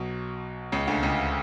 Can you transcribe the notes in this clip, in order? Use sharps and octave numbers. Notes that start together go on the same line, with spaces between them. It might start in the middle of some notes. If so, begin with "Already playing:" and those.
Already playing: B1 B2
C#2 C#3
D2 D3
C#2 C#3